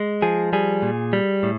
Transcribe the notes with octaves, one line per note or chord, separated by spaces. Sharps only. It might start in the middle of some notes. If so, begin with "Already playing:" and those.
Already playing: G#3
F3 G#4
G3 G#4
A#2
G3
A2